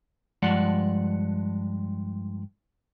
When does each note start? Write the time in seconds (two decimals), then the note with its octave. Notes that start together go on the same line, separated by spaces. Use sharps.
0.43 G2 F3 G#3 D5 F#5